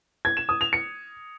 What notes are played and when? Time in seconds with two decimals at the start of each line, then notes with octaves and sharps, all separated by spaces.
0.25 G#6
0.37 E7
0.49 D#6
0.61 F7
0.73 C#7